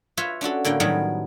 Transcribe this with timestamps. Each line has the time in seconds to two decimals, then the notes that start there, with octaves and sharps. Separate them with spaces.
0.17 F4 B4 C#5 E5
0.41 C#4 D4 F#4 A4
0.64 A2 D3 A#3 G5
0.80 A2 D#3 F#3 G3 B3